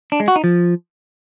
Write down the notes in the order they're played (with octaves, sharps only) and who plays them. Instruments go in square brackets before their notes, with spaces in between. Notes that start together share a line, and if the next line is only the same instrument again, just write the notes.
[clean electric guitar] D4
G#3
F#4
D#4
F3